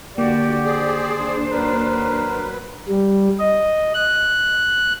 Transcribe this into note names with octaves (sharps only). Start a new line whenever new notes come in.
D3 A#3 F#4 G4 D5
D#2 D4 G#4 C5 D5
F#3 A#4 B4
G3
D#5
F#6